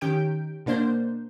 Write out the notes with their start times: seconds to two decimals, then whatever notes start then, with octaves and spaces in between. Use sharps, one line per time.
0.01 D#3 C#4 G4 G5 G6 D7
0.66 B2 A#3 D4 C5 G6